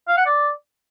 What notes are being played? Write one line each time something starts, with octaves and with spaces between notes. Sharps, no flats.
F5
F#5
D5